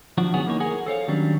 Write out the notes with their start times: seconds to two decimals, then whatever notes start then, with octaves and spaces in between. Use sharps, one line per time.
0.18 F3 D4 F#4
0.34 F#2 D#3 B3 C#4 F#4 G#4
0.46 E3 A#3 D#4 C#5
0.60 G#4 A#4 F#5 G#5
0.86 A4 C5 C#5 F5
1.08 D#3 F#3 G3 C#4 D4